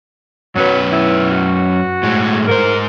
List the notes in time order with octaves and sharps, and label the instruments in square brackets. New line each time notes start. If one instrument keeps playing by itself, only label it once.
[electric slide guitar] F#2 C#4 B4 [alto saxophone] F#3
[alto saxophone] E4
F#4
[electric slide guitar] A2 G#3
[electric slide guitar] G#2 C5 [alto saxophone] A#4